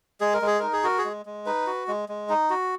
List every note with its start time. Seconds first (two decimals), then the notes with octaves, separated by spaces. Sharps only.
0.21 G#3 G#4
0.34 A#4
0.42 G#3 G#4
0.60 D#4 A#4
0.73 G#4
0.84 F#4 A#4
0.98 G#4
1.05 G#3
1.26 G#3
1.46 D#4 B4
1.67 F#4
1.88 G#3
2.09 G#3
2.29 D#4
2.50 F#4